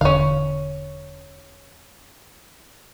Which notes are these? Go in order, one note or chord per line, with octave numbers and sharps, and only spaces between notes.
E1 D3 C#4 F5